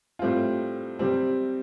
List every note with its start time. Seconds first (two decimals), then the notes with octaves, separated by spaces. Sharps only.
0.19 A2 G3 C4 F4
0.99 C3 G3 C4